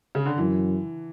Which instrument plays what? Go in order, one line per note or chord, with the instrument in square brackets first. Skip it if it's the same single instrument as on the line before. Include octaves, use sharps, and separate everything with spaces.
[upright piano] C#3
D3
[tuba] F#2 [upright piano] E3